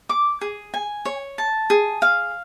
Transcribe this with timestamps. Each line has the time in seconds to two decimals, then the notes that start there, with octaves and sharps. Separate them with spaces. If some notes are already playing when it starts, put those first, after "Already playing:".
0.09 D6
0.41 G#4
0.74 G#5
1.05 C#5
1.38 A5
1.70 G#4
2.02 F5